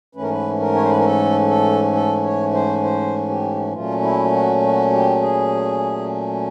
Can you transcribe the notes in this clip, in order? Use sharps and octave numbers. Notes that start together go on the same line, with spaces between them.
G#2 E3 A3 C#4 B4
A#4
B4
A#4
C#5
C5
B4
A#4
A4
A4
A4
C#5
C5
C5
G4
A#2 F#3 A3 C#4 F4
E4
F#4
F#4
G4
G#4